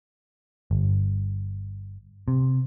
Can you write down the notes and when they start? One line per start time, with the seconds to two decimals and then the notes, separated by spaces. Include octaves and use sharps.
0.71 G1
2.28 C3